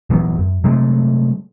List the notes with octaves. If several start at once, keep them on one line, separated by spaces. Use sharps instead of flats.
D#1 E3 F#3 B3
F#2
C3 F#3 G#3 A3